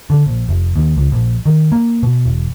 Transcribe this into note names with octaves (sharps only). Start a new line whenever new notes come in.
D3
A#1
F1
D#2
C#2
A#1
D#3
A#3
B2
E1